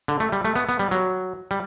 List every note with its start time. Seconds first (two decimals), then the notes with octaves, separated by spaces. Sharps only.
0.08 D3
0.20 A3
0.32 G3
0.45 A3
0.55 B3
0.69 B3
0.79 G3
0.91 F#3
1.51 G3